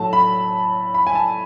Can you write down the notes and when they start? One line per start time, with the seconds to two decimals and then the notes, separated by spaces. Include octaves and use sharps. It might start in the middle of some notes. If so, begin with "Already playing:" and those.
Already playing: A2 F#3 A3 A5
0.13 B5
0.94 B5
1.07 G#5
1.15 A5